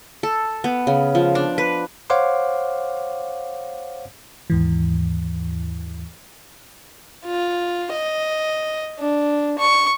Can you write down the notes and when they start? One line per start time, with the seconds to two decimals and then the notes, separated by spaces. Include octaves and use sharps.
0.23 A4
0.64 B3
0.87 C#3
1.15 F3
1.35 D4
1.58 B4
2.10 C5 C#5 F5 F#5 C6 D6
4.50 D#2 G#2 E3
7.25 F4
7.93 D#5
8.99 D4
9.59 C#6